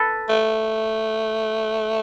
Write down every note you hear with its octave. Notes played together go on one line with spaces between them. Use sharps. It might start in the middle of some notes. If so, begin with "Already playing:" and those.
Already playing: A4 B4
A3